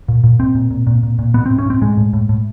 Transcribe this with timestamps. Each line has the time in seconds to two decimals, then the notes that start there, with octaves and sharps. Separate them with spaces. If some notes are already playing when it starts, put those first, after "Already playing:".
0.08 A#2
0.24 A#2
0.40 A#2 C4
0.55 A#2
0.71 A#2
0.87 A#2
1.03 A#2
1.19 A#2
1.34 A2 B3
1.46 A2 C4
1.59 C#4
1.66 A2 C4
1.81 A2 G#3
1.97 A2
2.13 A2
2.29 A2